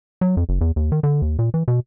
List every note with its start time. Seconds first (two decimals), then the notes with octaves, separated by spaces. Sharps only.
0.21 F#3
0.37 F2
0.49 F#1
0.61 E2
0.76 D#2
0.92 D#3
1.03 D3
1.22 D#2
1.39 A#2
1.54 E3
1.68 B2